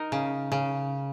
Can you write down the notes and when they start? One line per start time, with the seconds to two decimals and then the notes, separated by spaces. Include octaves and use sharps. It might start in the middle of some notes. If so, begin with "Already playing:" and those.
Already playing: D#4 A#4
0.12 C#3
0.52 C#3